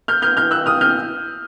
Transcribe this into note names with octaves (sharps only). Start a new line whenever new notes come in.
F6 G6
F6 G6
F6 G6
E6 F#6
D#6 F6
F6 G6